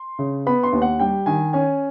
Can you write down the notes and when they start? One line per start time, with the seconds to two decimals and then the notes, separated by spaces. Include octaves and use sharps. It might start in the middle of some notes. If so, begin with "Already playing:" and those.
Already playing: C6
0.19 C#3
0.47 B3 B5
0.63 C6
0.73 D#2
0.82 F#5
0.99 G3 G5
1.26 D#3 G#5
1.53 C#4 G#5